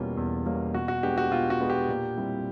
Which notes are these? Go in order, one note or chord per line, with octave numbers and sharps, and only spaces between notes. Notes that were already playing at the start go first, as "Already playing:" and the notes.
Already playing: E2 B2 G3 A#3 C#4 F4
E2
B2 G3 A#3 C#4
B2 F#4
F#4
G#3 B3 D4 G4
F#4
B2 F4
F#4
G#3 B3 D4
G4
A#2
G3 C4 E4